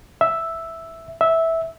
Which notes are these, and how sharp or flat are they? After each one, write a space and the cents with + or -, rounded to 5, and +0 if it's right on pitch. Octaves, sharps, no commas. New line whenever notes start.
E5 +0
E5 -10